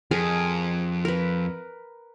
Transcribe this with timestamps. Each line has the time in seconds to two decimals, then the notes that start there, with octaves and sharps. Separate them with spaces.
0.11 F2 G#4 A#4 G#5
1.05 A#4 B4